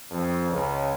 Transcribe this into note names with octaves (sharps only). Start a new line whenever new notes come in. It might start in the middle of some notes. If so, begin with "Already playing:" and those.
F2
C#2